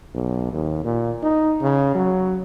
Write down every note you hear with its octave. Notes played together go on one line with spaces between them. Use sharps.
B1
D#2
A#2
D#4
C#3
F#3